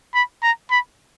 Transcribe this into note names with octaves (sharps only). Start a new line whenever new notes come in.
B5
A#5
B5